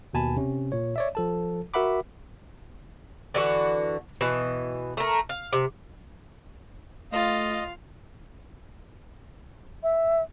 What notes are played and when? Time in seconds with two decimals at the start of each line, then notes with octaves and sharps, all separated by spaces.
0.14 D#2 B2 G#5 A5 B5
0.37 C3 C#4
0.72 A#2 C#5
0.96 C#5 D5 E5
1.15 F3 A4 A5
1.74 F#4 A#4 E5 F#5 B5 D6
3.34 D3 E3 F#4
4.21 B2 E3
4.97 A3 A#4
5.29 F5
5.53 C3
7.12 A3 F4 D#5 F5 A6
9.83 E5